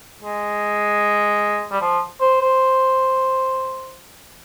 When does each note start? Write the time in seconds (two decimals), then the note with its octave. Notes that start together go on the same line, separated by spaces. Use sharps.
0.23 G#3
1.71 G3
1.81 F3
2.21 C5
2.41 C5